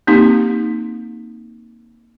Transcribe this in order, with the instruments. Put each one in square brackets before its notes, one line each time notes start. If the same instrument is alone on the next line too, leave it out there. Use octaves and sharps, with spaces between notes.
[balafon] A#3 C4 D#4 G4 C6